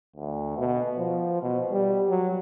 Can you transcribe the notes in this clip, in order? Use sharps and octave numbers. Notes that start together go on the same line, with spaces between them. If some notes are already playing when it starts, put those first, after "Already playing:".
D2
B2
F3
B2
G3
F#3